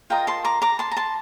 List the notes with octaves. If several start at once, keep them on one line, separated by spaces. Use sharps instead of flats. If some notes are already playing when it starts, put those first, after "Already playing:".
F4 A#4 D#5 G5 A#5
A5 C6
A#5 D6
A#5 D6
A5 C6
A#5
A5 C6